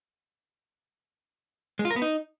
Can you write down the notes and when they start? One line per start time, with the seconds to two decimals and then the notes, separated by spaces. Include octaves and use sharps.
1.79 G#3
1.85 F4
1.91 A#4
1.96 B3
2.02 D#4